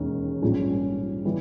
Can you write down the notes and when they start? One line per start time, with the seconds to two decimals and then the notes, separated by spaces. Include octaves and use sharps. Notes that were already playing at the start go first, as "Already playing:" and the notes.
Already playing: E1 D#2 D#3 G#3 C#4
0.42 A#1 G#2 G3 C#4
1.25 E3 G3